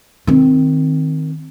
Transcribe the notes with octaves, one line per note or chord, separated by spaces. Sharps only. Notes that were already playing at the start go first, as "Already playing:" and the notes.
D#3 C4